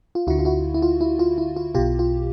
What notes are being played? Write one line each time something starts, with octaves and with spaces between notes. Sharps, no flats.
F4
D2 D3 E4 F#4
F4
E4 F#4
E4
F4
E4
F4
E4
F4
B1 B2 F4 G4
F4